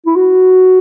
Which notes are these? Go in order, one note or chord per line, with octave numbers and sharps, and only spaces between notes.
E4
F#4